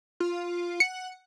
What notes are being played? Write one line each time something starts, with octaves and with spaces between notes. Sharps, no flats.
F4
F#5 C#7